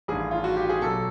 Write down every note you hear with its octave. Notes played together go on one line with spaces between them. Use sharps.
A1 G2 D#3 G#4
F4
F#4
G4
G#4
B1 B2 A4